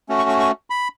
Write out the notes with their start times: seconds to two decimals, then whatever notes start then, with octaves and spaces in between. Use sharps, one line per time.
0.09 A3 C#4 F#4
0.19 C#6
0.29 C#6
0.39 C#6
0.70 B5